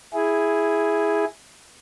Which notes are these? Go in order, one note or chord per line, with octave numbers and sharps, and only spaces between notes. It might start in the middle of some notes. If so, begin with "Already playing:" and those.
E4 G#4